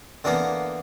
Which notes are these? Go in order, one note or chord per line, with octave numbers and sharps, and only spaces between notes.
D3 E3 A#3 B3